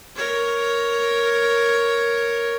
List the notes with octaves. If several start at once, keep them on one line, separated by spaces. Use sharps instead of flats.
A#4 C#5